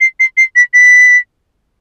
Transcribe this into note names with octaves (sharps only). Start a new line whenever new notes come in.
C7
C7
C7
B6
B6